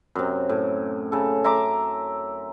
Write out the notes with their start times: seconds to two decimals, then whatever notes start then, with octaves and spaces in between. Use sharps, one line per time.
0.15 F#2 C3
0.49 A2
1.12 C#3 A4
1.44 E5 A#5 C6 D6